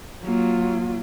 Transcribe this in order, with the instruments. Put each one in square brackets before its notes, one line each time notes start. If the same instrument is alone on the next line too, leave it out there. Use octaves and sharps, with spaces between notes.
[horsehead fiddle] F#3 F4 [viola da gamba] A#3